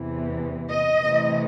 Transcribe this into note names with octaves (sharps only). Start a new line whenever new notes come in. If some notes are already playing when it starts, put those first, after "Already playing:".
Already playing: E2 C3 E3
D#5
C3 E3 A3